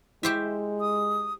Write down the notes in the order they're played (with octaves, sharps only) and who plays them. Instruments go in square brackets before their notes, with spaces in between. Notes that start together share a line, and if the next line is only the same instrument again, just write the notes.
[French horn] G#3 [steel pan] E4 [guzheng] G4 C5 E5
[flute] D#6